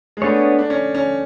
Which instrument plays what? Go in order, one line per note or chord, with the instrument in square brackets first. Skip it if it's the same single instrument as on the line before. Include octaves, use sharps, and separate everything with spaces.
[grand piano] G#3
[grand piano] A3 [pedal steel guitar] B3 D4 G#4 C#5
[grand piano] D4
C#4
C#4